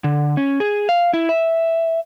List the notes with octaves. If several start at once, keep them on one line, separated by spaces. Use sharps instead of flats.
D3
C#4
G#4
F5
E4
E5